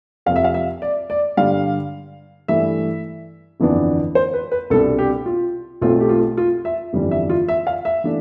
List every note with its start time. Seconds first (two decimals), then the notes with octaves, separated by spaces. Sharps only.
0.26 F2 C3 F3 C4 F5
0.36 E5
0.44 F5
0.54 E5
0.82 D5
1.10 D5
1.37 G2 D3 G3 D4 F5
2.48 G2 E3 A3 E5
3.60 G1 F2 E3 B3 D4
4.15 C5
4.34 B4
4.52 B4
4.70 C2 B2 G3 D4 A4
4.99 G4
5.26 F4
5.81 B1 B2 A3 C4 F4
6.00 G4
6.09 F4
6.37 F4
6.65 E5
6.93 G1 F2 E3 G3 D4
7.11 E5
7.30 F4
7.48 E5
7.67 F5
7.85 E5
8.04 E3 A3 D4